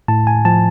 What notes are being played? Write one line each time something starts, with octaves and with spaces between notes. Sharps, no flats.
A2 A5
G#5
F3 A5